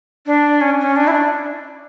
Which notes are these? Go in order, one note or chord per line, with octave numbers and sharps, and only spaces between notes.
D4
C#4
C#4
D4
E4
D4